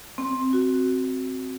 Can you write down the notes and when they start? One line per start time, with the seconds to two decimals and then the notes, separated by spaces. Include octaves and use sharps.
0.18 C4
0.53 F#4